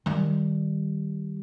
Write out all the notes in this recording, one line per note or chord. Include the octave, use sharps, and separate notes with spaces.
D#3 G3